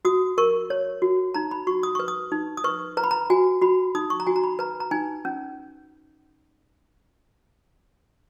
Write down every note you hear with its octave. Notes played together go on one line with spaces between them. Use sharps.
F#4 D#6
A#4 C#6
C#5
F#4
D#4 A#5
B5
F#4 C#6
D#6
B4 C#6
D#6
D#4
D#6
B4 C#6
B4 A#5
B5
A#5
F#4 G#5
F#4 B5
D#4 D#6
C#6
A#5
F#4 G#5
A#5
B5
B4 A#5
A#5
D#4 G#5
C#4